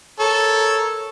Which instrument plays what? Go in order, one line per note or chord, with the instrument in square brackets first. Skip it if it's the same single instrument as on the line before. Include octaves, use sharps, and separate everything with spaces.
[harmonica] A4 A#4 C#5